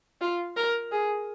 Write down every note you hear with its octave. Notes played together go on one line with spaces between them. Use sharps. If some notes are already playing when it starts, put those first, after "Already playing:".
F4
A#4
G#4